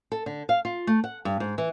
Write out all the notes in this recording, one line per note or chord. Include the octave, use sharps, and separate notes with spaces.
A4
D3
F5
F4
A3
F#5
G2
G#2
E3